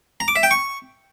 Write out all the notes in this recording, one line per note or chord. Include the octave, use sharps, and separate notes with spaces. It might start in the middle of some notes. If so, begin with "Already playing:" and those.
A#5
D6
E5
G5
C#6